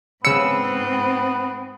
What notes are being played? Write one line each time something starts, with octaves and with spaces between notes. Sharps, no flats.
G#2 C#3 B3 C4 E6 C#7